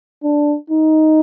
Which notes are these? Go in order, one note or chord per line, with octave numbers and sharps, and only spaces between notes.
D4
D#4